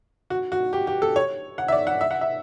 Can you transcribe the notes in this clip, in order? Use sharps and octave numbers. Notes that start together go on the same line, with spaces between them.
F#4
F#4
G4
G4
A4
C#5
F#5
E5
D5
F#5
E5
F#5
E5